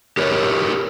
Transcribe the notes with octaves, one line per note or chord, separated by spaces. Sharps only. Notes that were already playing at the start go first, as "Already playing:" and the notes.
G4 A#4 B4 C#5